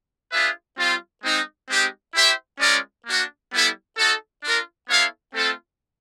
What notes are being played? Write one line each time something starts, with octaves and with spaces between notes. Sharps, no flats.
D4 F4 G#4 B4 E5
G3 C4 F4
G#3 C4 D#4
G#3 C4 D#4 G4
E4 G4 C5 E5 G5
G#3 C#4 F4 A#4 D5
A#3 D4 F#4
G3 B3 E4 A4
D#4 F#4 A4
D4 F4 A#4
B3 E4 A4 C#5 F5
A3 C4 F4 A4